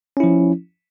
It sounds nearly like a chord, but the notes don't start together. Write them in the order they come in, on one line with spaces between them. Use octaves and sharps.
C#4 E4 F3